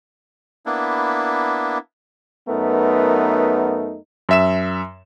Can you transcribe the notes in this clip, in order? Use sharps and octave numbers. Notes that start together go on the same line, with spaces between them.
A#3 B3 D4 E4
F#2 A3 B3 D#4 A#4 B4
F#2 E5 E7